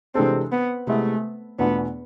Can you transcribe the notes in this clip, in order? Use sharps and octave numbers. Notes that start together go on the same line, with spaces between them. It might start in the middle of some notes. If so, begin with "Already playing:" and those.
C3 E3 G#3 C4 D4 A4
B3
C3 G#3 A3 B3 E4
E2 B2 A3 B3 D4 F4